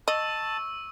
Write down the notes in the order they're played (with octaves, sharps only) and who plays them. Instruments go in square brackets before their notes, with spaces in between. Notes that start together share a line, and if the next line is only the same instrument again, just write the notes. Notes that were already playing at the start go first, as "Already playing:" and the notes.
[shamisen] D#5 [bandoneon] A5 [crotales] C#6 E6